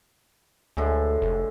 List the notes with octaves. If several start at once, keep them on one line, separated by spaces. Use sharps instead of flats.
D2 A2 D3 G#3
F1